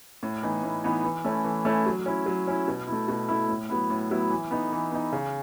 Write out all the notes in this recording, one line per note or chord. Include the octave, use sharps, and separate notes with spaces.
A2
E3 B3 D#4
A2
E3 B3 D#4
E3
A3 C#4 E4
E3
A3 C#4 E4
F#3
C#4 E4
F#3
C#4 E4
B2
E4
A3
B2
A3 E4
A2
F#3 B3 E4
A2
F#3 B3 E4
E3
B3 D#4
E3
B3 D#4
C#3